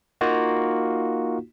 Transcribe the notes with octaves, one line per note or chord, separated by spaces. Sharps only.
A#3 D#4 F4 F#4